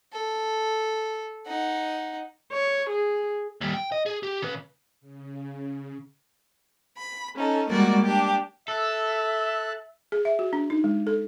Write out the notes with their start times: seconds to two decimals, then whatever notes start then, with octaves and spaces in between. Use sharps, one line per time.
0.13 A4
1.47 D#4 F#5
2.53 C#5
2.89 G#4
3.61 D#2 G3
3.74 G5
3.92 D#5
4.06 G#4
4.23 G4
4.42 C#3 B4
5.01 C#3
6.96 B5
7.36 C#4 D#4 A4
7.70 G3 G#3 A#3 F#4 D5
8.03 D4 G4
8.68 A4 E5 A5 F#6
10.12 G#4
10.25 E5
10.39 F#4
10.53 D4
10.70 D#4
10.84 G#3
11.07 A4